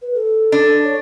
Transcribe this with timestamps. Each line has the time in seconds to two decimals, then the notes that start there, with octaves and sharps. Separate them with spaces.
0.02 B4
0.15 A4
0.52 D4
0.84 C#5